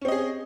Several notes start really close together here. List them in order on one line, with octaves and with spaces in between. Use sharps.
C#4 C4 D#5 G#4